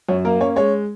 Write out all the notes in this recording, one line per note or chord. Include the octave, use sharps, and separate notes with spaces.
F#2 C#5
A#3 A#4
C#4 C#5
G#3 C#5